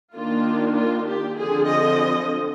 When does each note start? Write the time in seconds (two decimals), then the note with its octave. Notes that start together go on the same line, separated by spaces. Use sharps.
0.14 D#3 A#3 D4 F4
0.76 F4
1.07 G4
1.38 D3 F3 C4 G#4
1.69 D#5